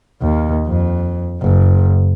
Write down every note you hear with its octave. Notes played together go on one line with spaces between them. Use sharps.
D#2
F2
F#1